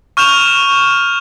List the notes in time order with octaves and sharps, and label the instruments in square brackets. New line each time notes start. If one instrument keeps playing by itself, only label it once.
[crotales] C#6 F6 G6 E7 F7